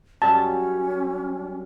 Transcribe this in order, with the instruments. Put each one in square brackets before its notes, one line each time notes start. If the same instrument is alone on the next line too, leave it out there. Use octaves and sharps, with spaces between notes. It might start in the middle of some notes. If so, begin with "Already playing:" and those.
[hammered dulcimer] F#2 G3 [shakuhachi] C#4 [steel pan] A5